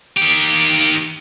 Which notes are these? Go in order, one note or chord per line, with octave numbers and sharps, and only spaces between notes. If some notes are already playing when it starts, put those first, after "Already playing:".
D#3 G4